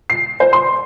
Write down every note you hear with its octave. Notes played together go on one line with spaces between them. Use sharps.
C7
C5
C6